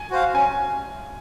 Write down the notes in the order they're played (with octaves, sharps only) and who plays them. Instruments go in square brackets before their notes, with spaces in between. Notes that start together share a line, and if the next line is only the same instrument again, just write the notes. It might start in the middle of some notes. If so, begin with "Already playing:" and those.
Already playing: [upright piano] G#5
[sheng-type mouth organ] F#4 C5 F5
[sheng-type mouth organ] C#4 [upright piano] G#5